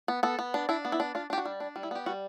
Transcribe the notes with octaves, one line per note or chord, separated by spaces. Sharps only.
B3
B3 A4
B3
D4
D4 E4
B3
E4
D4
D4 F4
D4 G4
F#4
G3
D4
G3
E4
B3 G4
G3 F#4